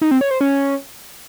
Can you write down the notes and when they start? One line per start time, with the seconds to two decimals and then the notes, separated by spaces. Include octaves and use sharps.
0.01 D#4
0.11 C4
0.21 C#5
0.31 C5
0.41 C#4